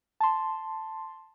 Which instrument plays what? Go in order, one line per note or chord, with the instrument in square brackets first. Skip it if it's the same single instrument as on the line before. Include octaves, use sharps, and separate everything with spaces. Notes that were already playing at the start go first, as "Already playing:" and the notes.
[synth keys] A5 C6